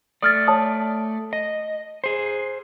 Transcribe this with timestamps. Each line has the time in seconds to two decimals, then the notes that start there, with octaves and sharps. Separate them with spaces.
0.22 A3 D5 D#6 F6 A6
0.47 C#5 A5 D#6
1.33 D#5
2.04 G#4 C5